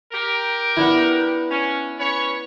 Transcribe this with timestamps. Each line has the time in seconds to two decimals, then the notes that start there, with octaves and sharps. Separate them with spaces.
0.12 G4 A#4
0.77 B3 D4 E4
1.51 C#4
2.00 C#4 B4 C#5